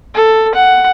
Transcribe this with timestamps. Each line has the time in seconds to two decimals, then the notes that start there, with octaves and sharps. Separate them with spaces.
0.14 A4
0.55 F#5